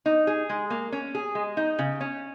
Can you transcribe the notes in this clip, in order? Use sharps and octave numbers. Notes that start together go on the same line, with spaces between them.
D#4
G#4
G#3
A#3
C#4
G#4
G#3
D#4
C#3
C#4